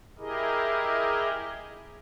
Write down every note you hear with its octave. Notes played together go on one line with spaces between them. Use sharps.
E4 G4 G#4 A#4 D#5